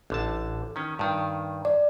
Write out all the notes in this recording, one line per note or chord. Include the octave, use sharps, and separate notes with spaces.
A1 D3 A5
D#3 C#4
G2 D#3
D5